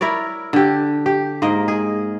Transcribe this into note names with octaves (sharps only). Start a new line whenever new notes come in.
E4 A#4 C#5 D5
D3 G4
G4
G#2 A#3 A#4 D#5
G#4